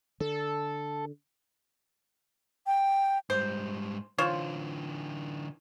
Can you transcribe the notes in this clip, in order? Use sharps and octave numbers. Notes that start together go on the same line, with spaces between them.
D3 A4
G5
G#2 G3 C5
D3 E3 F4 C5 C#5